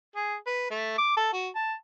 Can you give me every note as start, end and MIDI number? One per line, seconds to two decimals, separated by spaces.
0.16 0.35 68
0.47 0.65 71
0.71 0.96 57
0.98 1.17 86
1.17 1.32 69
1.33 1.49 66
1.55 1.73 81